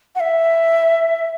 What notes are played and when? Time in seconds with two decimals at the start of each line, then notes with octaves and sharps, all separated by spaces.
0.15 F#5
0.20 E5